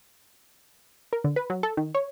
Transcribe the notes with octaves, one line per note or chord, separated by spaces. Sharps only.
A#4
D3
B4
F#3
A4
D#3
C#5